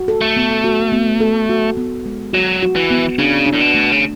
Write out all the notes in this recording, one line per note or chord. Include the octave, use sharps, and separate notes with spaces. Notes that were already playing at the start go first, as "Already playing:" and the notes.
Already playing: F#4
A4
A3
B3
F#4
B3
A4
F#4
B3
G#3
F#3 F#4
F#4
E3
B3
C#3 D4
D4
A2
B2
A3
C#3